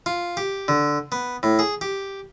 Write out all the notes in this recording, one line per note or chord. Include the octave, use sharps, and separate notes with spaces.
F4
G4
D3
B3
A2
G#4
G4